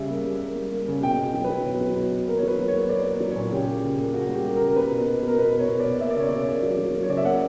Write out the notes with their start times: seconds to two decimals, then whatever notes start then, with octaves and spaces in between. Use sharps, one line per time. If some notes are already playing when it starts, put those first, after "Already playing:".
Already playing: C#3 G3 E5
0.09 A#3
0.24 G3
0.40 A#3
0.56 G3
0.72 A#3
0.88 C#3
1.02 B2 G5
1.18 B2
1.34 F#3
1.44 B4
1.50 F#3
1.65 B2
1.81 F#3
1.96 B2
2.11 B2
2.27 A#3 A#4
2.38 C#5
2.43 F#3 B4
2.59 F#3
2.68 C#5
2.74 A#3
2.82 C#5
2.89 A#3 D5
3.05 A#3
3.20 F#3
3.31 C#5
3.36 A#2
3.52 C#3 G4
3.67 A#3
3.83 C#3
3.98 A#3
4.14 C#3 F#4
4.29 G3
4.35 G4
4.45 A#3
4.56 A#4
4.61 C#3
4.68 A#4
4.76 A#3 B4
4.91 B2
5.07 B2
5.22 B2
5.28 A#4
5.38 B2 B4
5.54 B2
5.59 C#5
5.69 B2
5.80 D5
5.85 B2
6.00 A#3 E5
6.10 D5
6.16 C#3 C#5
6.28 C#3 D5
6.47 A#3
6.63 F#3
6.78 F#3
6.94 F#3
7.03 C#5
7.09 C#3 D5
7.17 E5
7.25 A#3 F#5